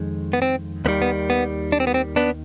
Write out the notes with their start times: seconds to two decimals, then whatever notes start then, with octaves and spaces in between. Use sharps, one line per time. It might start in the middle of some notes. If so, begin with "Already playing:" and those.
Already playing: F2 D#3 G#3
0.33 B3
0.42 C4
0.85 D#2 D#3 G3 B3
1.02 B3
1.30 B3
1.72 D4
1.80 C4
1.87 B3
1.94 C4
2.16 B3 D4